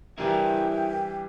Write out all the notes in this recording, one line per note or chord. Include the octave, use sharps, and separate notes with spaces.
E3 G3 D4 E4 A#4 G5